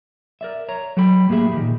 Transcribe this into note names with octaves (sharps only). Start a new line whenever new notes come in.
A#4 D5 E5
C#5 A#5
F#3 A4 G5 B5
A2 A#3 G4 G#4 E5 B5
A#2 D#3